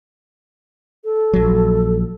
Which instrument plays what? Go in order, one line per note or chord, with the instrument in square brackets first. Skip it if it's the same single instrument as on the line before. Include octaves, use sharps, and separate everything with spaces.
[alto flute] A4
[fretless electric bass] A#1 F#3